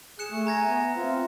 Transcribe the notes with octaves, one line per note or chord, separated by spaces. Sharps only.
G#4 F#6 C#7 E7
A3 G#5
A#5 G#6 A#6
B3 E5
C4 F4